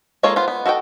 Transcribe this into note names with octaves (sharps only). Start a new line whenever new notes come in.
G#3 A#3 F4 A4 C#5
B3 F4 C5
B3
F#4 A4 D#5 G5